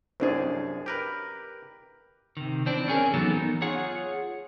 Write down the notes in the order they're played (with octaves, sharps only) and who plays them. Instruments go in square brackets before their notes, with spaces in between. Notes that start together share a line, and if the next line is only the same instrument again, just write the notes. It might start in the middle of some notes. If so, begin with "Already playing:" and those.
[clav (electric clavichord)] C2 F#2 G#4 [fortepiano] C4 D4
[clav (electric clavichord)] G4 A#4 B4
[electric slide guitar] C3 D#3
E3 C4 D4
C#4 G#4 A#4
E3 F#3 B3 D#4 A4
B3 D#4
F4 G#4 C#5 F#5